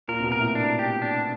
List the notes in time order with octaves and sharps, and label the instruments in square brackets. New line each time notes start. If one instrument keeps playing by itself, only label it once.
[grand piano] A#2 [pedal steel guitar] A#4
[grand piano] C3
B2
[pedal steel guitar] A#4
[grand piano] A2
[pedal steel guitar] D4
G4
D4